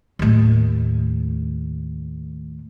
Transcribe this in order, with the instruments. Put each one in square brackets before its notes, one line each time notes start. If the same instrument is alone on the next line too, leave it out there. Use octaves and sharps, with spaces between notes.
[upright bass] D#2 A2